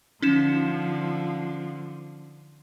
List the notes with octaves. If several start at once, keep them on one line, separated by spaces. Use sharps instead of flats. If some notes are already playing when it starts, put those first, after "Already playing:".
D3 F3 C#4 D#4 E7